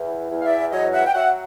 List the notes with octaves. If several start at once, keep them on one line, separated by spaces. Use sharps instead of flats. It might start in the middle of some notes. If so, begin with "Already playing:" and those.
Already playing: E2 E3
E2
F5
D5 E5
F#3 C#5 D#5
E5 F#5
G5
F#3 E5 F#5